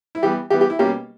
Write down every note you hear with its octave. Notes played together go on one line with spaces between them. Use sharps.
E4
E3 G3 B3 G4
E3 G3 B3 G4
G4
E4
B2 G3 A#3 C#4 G4